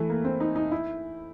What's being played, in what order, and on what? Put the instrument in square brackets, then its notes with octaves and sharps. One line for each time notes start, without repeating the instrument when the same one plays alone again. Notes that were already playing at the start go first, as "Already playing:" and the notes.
Already playing: [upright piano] E3 A3
A#3
C4
D#4
D#4
E4